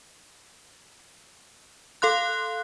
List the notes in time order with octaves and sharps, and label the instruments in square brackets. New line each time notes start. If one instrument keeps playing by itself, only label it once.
[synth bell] A4 F5 C6 F#6